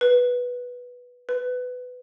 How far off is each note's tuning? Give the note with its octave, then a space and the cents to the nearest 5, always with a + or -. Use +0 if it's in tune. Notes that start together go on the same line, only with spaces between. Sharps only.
B4 -5
B4 +15